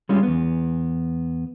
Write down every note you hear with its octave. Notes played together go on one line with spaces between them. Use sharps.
G3 G#3 C#4 F4
E2 B3